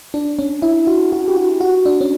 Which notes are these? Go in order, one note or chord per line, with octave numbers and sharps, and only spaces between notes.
D4
C#4
E4
F#4
F#4
G4
F#4
F#4
D4
C#4